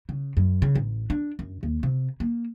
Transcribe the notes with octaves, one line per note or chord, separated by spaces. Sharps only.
C#3
F#2
C#3
A1
D4
F#2
D#2
C3
A#3